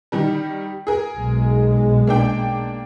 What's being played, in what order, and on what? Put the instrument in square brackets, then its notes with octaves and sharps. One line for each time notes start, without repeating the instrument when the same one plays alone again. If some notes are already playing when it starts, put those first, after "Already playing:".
[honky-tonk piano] D#3 G3
G#4 A#4
[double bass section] B1 G#3
[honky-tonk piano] A#3 D4 G5